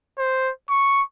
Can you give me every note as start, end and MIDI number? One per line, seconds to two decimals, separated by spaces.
0.19 0.51 72
0.69 1.02 85